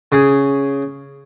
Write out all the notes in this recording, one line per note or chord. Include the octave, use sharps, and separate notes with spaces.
C#3 G#4